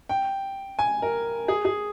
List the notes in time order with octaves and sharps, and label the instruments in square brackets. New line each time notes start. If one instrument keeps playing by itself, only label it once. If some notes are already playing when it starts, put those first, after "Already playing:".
[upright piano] G5
G#5
A#4
G#4
G#4